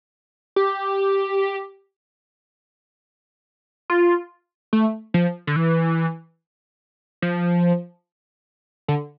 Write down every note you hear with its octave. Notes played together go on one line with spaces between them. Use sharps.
G4
F4
A3
F3
D3
E3
F3
D3